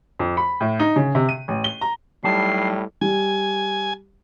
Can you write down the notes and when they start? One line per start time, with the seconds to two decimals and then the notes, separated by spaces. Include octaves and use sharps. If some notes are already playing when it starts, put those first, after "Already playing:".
0.19 F2
0.37 B5
0.61 A2
0.79 D#4
0.96 C#3
1.15 C3
1.29 D#7
1.48 A1
1.64 G7
1.81 A#5
2.24 A2 F#3 G3 D#4 A5 C7
3.01 G3 G#5